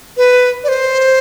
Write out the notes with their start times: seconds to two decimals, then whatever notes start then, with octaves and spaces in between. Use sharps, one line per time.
0.17 B4
0.64 D5
0.68 C5